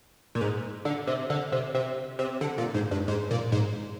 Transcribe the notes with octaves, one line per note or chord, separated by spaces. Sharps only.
A#2
G#2
D3
C3
D3
C3
C3
C3
D3
A#2
G#2
G2
G#2
A#2
G#2